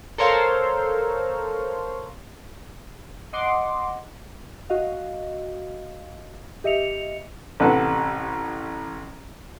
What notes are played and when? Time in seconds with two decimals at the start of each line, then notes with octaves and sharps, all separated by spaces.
0.18 A4 A#4 C5 C#5 F5
3.33 D#5 F#5 C6 D6
4.70 F#4 D#5 F5
6.64 G4 D#5 E5 C#7 F7
7.60 A1 C3 A4 B4 F#5